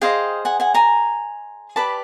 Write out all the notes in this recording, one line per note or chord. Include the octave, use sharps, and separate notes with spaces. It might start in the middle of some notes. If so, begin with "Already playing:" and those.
G#4 C5 D#5 F5 G5
F#5 G#5
F#5 G#5
G#5 A#5
G4 B4 D5 A5 B5